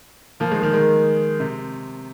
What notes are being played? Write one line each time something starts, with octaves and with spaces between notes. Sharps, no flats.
F3 A#3
D#3 G#3
D#3 G#3
D#3 G#3
C3